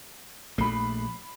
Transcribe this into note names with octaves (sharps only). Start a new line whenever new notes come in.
A#1 A3 B5 C7